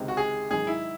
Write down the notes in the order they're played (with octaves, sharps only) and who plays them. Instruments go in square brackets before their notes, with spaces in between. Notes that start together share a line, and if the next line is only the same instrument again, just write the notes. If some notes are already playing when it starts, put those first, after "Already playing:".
Already playing: [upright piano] C#2 C3 D#3 G#3 C4
[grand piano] F#4
G#4
[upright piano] G#2 D#3 F#3 [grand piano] G#4
[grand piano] E4